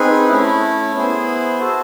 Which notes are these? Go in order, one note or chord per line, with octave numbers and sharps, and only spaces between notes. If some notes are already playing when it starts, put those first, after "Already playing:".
Already playing: C4 D#4 G#4 B4
A3 C#4 E4
B3 E4 G#4 C5
F#4 A4 C5